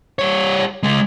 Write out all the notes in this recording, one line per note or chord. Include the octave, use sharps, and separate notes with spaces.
G3 C#5
C#3 G#3